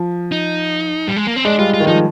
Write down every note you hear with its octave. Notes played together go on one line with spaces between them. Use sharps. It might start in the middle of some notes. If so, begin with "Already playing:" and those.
Already playing: F3
D#4
G3
G#3
A#3
C4
G#3 D4
G3 F4
F4
D#3
F3 D#4